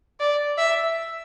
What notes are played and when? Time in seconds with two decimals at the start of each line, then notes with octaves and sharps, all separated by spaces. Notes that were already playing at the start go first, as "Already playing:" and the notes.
0.20 D5
0.58 E5